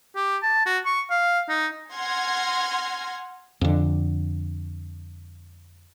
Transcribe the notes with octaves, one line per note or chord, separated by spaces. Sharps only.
G4
A5
F#4
C#6
F5
D#4
F#5 G#5 C6 F6 G#6 A#6
F2 D3